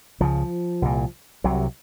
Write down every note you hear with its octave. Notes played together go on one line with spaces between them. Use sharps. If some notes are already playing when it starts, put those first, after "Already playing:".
C#2 C#3 F3
C2 A#2
C2 C3 F#3